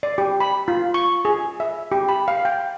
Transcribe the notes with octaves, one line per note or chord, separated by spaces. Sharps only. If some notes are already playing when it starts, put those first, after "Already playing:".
D5
G4
B5
F4
C#6
G#4
E5
G4
B5
F5
G5